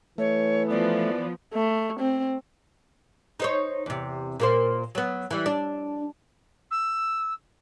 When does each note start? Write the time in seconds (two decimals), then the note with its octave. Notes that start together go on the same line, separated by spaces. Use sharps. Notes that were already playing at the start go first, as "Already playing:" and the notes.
0.18 E3 A3 C#5
0.69 F3 B3 D5
1.54 A3
2.00 C4
3.40 D#4 C5 C#5
3.86 E2 C3
4.40 A#2 A#3 C5
4.95 F#3 B3
5.31 E3 G3
5.46 D4
6.71 E6